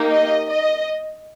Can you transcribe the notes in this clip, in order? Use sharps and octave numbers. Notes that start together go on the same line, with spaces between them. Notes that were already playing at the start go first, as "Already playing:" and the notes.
Already playing: A#3 D#4 G4
D#5
D#5